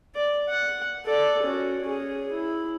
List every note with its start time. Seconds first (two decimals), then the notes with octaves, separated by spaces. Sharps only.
0.15 D5
0.49 F#5
1.05 A4 D5
1.43 C#4 F#4
1.84 C#4 G#4
2.32 E4